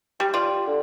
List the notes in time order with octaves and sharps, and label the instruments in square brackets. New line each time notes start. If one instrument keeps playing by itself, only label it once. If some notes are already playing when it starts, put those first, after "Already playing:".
[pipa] G3 [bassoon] G4
[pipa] F4 D5
[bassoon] D3